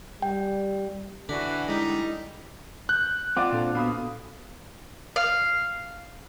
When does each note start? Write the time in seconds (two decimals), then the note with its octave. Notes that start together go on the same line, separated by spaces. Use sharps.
0.22 G3 G5
1.29 D3 E3 D4 F#4 D5 B6
1.68 G3 G#3 D#4 E4 D6 B6
2.89 F#6 G6
3.37 C4 F4 D5 F#5 D6
3.52 A#2 D4 A4
3.75 B2 F5 B5 D#6
5.16 F5